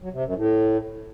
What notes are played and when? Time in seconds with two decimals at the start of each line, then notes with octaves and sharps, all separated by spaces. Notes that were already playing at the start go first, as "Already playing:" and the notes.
0.02 F#3
0.13 C3
0.24 F#2
0.36 A2